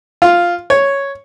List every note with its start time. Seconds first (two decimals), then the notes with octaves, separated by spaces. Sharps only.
0.22 F4
0.70 C#5